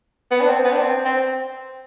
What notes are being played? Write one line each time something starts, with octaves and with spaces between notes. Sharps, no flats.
B3
D4
C4
B3
D4
C4
C4